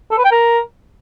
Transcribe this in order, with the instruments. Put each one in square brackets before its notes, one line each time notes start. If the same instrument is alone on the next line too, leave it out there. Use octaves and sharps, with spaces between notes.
[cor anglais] A4
B4
G5
A#4